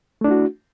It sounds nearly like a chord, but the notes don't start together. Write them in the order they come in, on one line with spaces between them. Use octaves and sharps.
A3 D4 E4 F#4